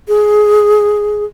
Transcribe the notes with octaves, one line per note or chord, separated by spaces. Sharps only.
G#4